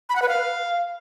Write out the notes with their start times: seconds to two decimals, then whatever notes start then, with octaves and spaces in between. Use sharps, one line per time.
0.09 B5
0.16 F#5
0.22 B4
0.28 F5